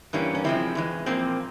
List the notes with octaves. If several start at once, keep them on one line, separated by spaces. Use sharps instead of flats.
G2 E3 G3 A#3 C#4
C#4
C3 F3 G#3 C4 E4
E2 E3 G#3
A#2 F3 A#3 C4